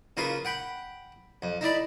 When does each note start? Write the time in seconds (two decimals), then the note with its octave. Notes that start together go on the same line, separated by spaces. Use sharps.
0.17 C#3 A#3 F4 B4
0.45 F#5 G5 B5
1.42 F2
1.61 D#4 E4 D5 B5